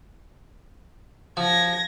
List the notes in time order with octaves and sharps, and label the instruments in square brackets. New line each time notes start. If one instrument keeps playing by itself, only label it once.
[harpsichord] F3 [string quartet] G#6 A#6